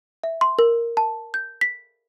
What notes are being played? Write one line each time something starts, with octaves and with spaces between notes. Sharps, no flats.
E5
C6
A#4
A5
G6
B6